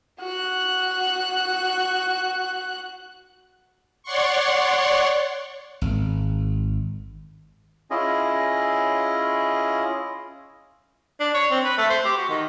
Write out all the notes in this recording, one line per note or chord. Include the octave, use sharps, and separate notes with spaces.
F#4 F#6
C#5 D5 F#5 C6 C#6
G#1
C#4 E4 F4 G#4 D#5
D4
C#5
C4
B4
A3
C5
G4
F#4
D#3